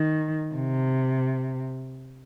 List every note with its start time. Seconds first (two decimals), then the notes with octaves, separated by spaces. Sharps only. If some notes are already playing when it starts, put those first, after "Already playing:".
Already playing: D#3
0.55 C3